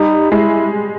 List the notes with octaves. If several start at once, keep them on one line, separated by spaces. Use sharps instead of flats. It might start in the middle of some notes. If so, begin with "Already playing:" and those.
Already playing: G3 D#4
G#3 E4